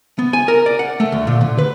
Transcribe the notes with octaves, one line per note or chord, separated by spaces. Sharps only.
B3
G#5
A#4
D5
F#5
A3
D2
A#2
D3
B4